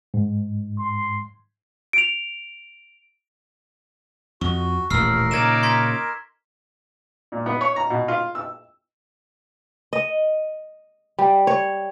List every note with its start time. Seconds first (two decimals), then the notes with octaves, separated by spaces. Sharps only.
0.14 G#2
0.79 C6
1.93 D7 F7
4.41 F2 F#4 C#6
4.90 D#1 A1 A#4 E6 F6 C7
5.31 A#2 C#3 D#4 D6 G#6 A#6 E7
5.63 C6 G#6 B6
7.32 A#2
7.46 B3
7.61 C#5
7.76 A#5
7.90 B2
8.08 F4
8.35 E6
9.93 D#5
11.19 G3
11.47 C#5